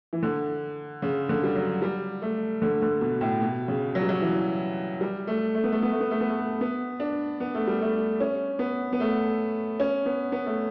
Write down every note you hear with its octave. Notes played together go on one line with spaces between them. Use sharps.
E3
D3
C#3
D3
G3
F#3
G3
A3
D3
D3
B2
A2
B2
C#3
F#3
G3
F#3
E3
G3
A3
A3
B3
A3
B3
A3
B3
A3
B3
A3
B3
D4
B3
A3
G3
A3
C#4
B3
B3
A3
C#4
B3
B3
A3